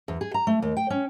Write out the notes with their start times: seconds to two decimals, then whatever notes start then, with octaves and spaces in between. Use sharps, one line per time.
0.08 E2
0.21 G#4
0.34 A#5
0.47 A3
0.62 D#2
0.77 G5
0.90 C#4